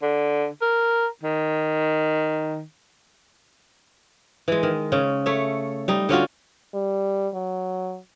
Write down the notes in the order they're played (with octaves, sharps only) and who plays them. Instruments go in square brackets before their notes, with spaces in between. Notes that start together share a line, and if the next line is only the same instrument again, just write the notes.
[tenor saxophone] D3
A#4
D#3
[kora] E3 G#3
D#3
C#3 C#4
A3 C#5 E5
G3 D#4
D3 C#4 F4 F#4
[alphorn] G3
F#3